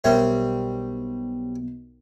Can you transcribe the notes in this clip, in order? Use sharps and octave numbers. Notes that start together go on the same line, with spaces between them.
B1 G3 C4 A#4 C#5 E5